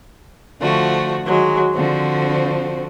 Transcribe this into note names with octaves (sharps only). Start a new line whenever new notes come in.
D3 F3 A3 F#4
D#3 F#3 G#3
D3 F3 C4 F#4